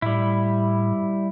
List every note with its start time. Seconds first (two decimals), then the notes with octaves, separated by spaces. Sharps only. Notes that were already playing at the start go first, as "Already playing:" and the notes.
0.02 A2 G3 E4